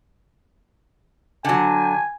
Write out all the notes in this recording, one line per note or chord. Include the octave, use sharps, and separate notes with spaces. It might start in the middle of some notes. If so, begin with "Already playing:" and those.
D3 F#3 G#5